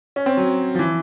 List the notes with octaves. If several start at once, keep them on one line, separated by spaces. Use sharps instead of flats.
C#4
C4
F#3
F3
E3